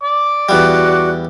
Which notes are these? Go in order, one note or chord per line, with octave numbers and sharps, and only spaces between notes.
D5 D6
E2 G3 F#4 F#6